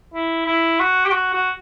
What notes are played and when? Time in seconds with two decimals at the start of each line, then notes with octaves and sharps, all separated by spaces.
0.14 E4
0.46 E4
0.79 F#4
1.05 G4
1.12 F#4
1.33 F#4